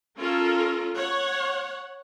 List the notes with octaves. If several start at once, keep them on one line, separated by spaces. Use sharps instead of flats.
C#4 F4 A4 A#4
C#5 F#5